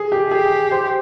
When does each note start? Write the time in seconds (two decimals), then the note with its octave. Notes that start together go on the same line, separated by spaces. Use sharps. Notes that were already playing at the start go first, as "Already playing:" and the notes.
Already playing: G#4
0.12 G4
0.31 G4 G#4
0.71 C5